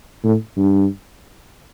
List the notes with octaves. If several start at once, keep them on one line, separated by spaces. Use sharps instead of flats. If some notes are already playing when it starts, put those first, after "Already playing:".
A2
G2